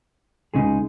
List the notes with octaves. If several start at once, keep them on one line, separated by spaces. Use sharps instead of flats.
C#2 C#3 G#3 D#4 G#4